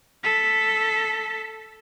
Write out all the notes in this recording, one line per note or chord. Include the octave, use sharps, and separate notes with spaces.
A4 B6